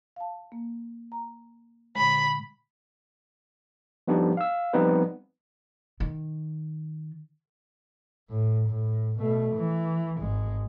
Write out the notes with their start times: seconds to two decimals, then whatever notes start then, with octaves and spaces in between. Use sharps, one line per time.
0.16 F5 A5
0.52 A#3
1.12 A#5
1.96 A#2 D3 G#3 B5
4.08 F3 G3 B3 D4 D#4 G4
4.37 F5 E6
4.73 F3 G3 B3 C4 D#4 B4
6.00 D#3
8.30 A2
8.68 A2
9.18 B2 A3
9.55 E3
10.20 G#1 G#3